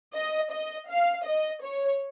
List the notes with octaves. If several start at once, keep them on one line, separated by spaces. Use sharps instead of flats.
D#5
D#5
F5
D#5
C#5